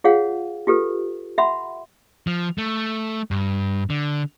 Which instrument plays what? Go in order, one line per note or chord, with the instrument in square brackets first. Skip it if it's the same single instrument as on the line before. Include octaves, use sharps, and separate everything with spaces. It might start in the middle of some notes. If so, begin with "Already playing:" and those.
[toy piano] F4 G#4 C#5 F5 F#5
F4 G4 A4 B4
E5 F#5 B5 C6
[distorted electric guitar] F3
A3
G2
D3